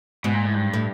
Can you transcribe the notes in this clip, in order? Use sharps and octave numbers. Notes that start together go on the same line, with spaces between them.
G#2 B2
A#2
A2
G2
A2